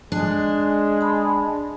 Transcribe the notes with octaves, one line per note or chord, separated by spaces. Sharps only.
G#3 D4
A5 B5